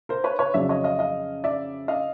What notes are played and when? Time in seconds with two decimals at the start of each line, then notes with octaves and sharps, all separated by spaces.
0.09 A#4 C5
0.24 B4 C#5
0.39 B4 C#5
0.54 F2 C#3 F#3 D5 E5
0.69 C#5 D#5
0.84 D#5 F5
0.99 D#5 F5
1.44 D5 E5
1.88 D#5 F5